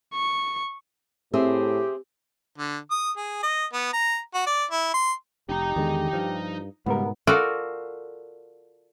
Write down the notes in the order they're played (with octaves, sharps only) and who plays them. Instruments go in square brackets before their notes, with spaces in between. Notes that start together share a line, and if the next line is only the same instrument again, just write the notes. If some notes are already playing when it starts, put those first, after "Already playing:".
[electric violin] C#6
[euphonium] A2 [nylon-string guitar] C4 G#4 E5 [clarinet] G4
[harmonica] D3
D#6
G#4
D#5
B3
A#5
F#4
D5
E4
C6
[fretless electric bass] F1 [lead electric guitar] D#4 A#5 [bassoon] G4
[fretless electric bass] E2 D3 G#3 [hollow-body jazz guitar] D#3
[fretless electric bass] G2 [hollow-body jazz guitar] F3
[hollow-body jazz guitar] C#2 G3 A#4 [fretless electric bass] G#2 B2 [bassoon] B3
[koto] F4 F#4 A4 A#4 D5